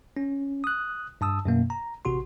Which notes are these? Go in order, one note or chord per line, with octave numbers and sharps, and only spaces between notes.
C#4
D#6 F#6
G2 A5 D#6 E6
F#2 B2 A#3
A#5
A1 C3 F#4 C6